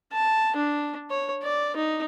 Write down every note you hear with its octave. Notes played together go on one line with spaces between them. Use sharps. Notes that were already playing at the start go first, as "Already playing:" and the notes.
A5
D4
C#5
D5
D#4